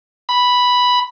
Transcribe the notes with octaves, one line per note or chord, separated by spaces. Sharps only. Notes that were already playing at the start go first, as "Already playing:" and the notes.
B5